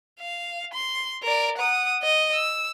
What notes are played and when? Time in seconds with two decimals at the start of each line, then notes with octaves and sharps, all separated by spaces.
0.20 F5
0.73 C6
1.23 A#4 D5
1.58 F#5 D#6
2.03 D#5
2.34 E6